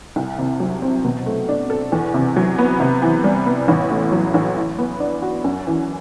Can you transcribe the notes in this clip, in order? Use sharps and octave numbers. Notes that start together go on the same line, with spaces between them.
C2
C3
F#3
C4
B2
A3
D4
A4
E2
C3
F#3
B3
C3
E3
G3
B3
A1
A2
F#3
A1
E3
B3
D4
F#4
F#2
E3